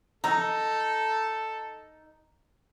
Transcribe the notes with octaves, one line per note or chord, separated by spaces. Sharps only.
D#4 A4 A#5 E6